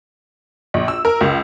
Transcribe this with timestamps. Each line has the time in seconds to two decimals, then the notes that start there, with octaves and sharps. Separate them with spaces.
0.74 A#1
0.88 E6
1.05 A#4
1.21 C#2